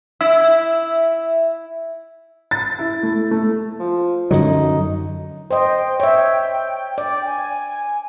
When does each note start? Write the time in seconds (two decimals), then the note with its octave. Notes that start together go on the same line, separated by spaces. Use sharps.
0.21 E4 E5
2.51 A6
2.79 E4
3.03 A3
3.31 A3
3.79 F3
4.31 F#2 D3 F#3 D#4
5.51 C5 D#5 G5
6.00 C#5 E5
6.98 D5
7.26 G#5